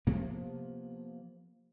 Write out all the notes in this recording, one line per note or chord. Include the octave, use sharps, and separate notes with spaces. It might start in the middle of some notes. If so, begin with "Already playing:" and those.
C3 F3 A#3 B3